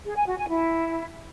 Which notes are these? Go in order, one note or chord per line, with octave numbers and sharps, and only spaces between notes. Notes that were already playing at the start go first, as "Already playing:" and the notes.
G#4
G#5
F#4
G#5
E4